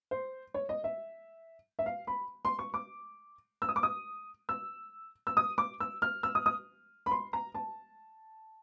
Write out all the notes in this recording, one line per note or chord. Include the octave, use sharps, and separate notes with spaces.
C5
C#5
D#5
E5
E5
F5
B5
C6
C#6
D6
E6
D#6
D6
D#6
E6
E6
D#6
D6
E6
F6
E6
D#6
D#6
B5
C6
A#5
A5